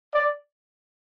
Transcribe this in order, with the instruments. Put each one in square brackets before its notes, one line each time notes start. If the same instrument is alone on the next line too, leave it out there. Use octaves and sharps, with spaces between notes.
[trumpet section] D5